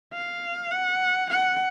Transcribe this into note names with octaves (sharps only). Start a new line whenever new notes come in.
F5
F#5
F#5